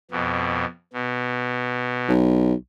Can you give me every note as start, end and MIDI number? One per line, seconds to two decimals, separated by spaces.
0.11 0.65 41
0.11 0.65 47
0.93 2.12 47
2.08 2.54 35